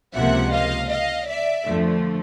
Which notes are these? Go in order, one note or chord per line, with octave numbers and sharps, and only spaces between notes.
C#2 C3 F3 A#3 E5 F#5
D#5 F5
D#5 F5
D5 E5
F2 D3 F3 A3